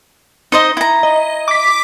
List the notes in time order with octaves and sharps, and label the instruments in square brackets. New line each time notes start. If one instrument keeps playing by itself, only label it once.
[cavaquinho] D#4 C5 D#5
E4 A#5
[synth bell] D#5
D6 B6